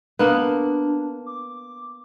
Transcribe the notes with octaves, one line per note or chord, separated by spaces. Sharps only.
A#3 B3 D4
D6